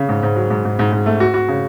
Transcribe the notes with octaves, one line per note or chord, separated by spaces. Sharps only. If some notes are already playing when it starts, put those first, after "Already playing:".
Already playing: C#3
G#2
G#2
F#3
G#2
G#2
G#2
G#2
A3
F#4
F#4
C#3